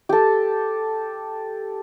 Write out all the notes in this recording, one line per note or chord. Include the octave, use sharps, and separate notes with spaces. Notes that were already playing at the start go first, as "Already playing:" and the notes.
G4 A4